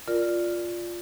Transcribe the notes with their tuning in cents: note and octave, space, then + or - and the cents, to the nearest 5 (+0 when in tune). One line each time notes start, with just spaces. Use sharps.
F4 +0 A#4 +0 D5 +5